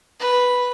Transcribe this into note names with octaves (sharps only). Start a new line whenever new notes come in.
B4